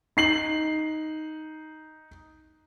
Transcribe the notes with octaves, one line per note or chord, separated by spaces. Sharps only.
D#4 C7 F#7